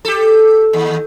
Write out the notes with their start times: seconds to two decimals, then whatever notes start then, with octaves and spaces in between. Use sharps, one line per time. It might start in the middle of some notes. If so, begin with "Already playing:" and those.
0.05 G4 A4
0.73 D#2